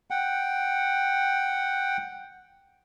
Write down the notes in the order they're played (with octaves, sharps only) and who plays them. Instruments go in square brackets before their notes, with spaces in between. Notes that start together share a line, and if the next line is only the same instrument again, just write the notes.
[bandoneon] F#5 G5